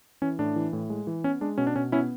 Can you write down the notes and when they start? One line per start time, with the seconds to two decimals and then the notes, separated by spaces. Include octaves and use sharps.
0.22 E3 C#4
0.39 A2 D4
0.56 E3
0.73 A2
0.90 G#3
1.07 E3
1.24 B3 C#4
1.41 G#3 D4
1.58 B2 C#4
1.67 D4
1.76 B2 C#4
1.92 B3 C#4 E4